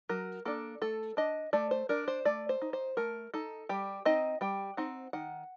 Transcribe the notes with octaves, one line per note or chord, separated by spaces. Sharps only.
F#3 A#4
A#3 D4 A4
A3 A4
D4 D#5
A3 D5
C5
D4 A#4
C5
A3 D5
C5
D#4
C5
A3 A#4
D#4 A4
G3 G4
C4 D#4 D#5
G3 G5
C4 D#4 F#5
D#3 F#5